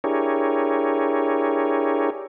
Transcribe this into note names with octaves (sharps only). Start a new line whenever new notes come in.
D4 E4 G4 G#4 A#4 C#5